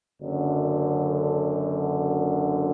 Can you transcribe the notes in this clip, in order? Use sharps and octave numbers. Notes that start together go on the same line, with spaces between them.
F#1 F#2 D3